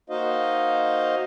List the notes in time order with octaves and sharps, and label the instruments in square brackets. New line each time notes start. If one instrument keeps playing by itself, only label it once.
[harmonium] A#3 D#4 F#4 C5 D#5 F5